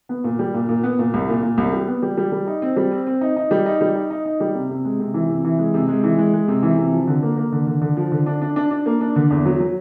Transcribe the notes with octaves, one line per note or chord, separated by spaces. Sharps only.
B3
A#2
G3
A#2
A#2
B3
A#2
C2
A#2
A#2
C2
G3
B3
G3
G3
G3
D#4
C4
G3
C4
C4
D#4
D#4
G3
D#4
G3
D#4
D#4
D#4
G3
C3
C3
G#3
C3
E3
C3
E3
G#3
C3
G#3
E3
G#3
G#3
C3
E3
C3
F3
D3
A#3
A#3
D3
D3
D3
F3
D3
D4
D4
D4
D4
A#3
D4
D3
E2
F#3
F#3